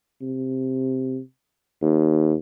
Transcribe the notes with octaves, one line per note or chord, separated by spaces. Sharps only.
C3
D#2